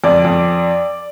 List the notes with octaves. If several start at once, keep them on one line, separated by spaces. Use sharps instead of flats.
F2 D5
F2